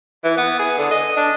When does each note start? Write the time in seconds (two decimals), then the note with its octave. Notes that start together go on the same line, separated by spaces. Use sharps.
0.24 E3
0.37 B3
0.59 G#4
0.78 D3
0.91 D#5
1.17 D4